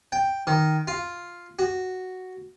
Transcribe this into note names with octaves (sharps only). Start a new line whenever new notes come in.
G5
D#3
F4
F#4